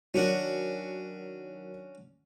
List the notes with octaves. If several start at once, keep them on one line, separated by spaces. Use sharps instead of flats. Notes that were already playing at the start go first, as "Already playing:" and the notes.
D#3 F#3 C#4 D4 F#4